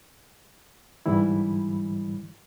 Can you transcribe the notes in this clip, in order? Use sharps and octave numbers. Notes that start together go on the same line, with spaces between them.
G#2 D3 E3 G3 E4